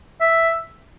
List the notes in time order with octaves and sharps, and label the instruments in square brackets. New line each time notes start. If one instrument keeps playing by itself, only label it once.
[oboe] E5